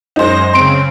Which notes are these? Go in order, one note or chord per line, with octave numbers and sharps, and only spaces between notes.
F#2 G#3 D#4 C5 A#6
C#3 C4 C6 D7